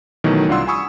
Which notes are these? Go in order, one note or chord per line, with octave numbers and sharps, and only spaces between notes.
B2 D#3 E3 F#3 A3
C2 D4 F4 F#5 C6 E6
G#5 B5 C#6 D#6 E6